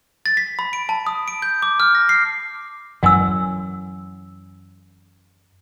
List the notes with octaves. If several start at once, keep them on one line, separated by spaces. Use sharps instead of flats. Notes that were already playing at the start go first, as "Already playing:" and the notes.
A6
B6
B5
D7
A5
D#6
D7
G6
D6
F6
A#6
C7
F#2 E3 F#5 G#5 E6